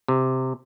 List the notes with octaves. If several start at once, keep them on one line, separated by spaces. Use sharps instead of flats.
C3